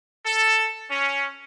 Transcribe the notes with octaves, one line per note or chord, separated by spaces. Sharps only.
A4
C#4